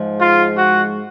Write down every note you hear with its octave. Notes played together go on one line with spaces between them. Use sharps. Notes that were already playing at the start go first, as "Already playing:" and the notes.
Already playing: G#2 F3 G#3
F4
F#4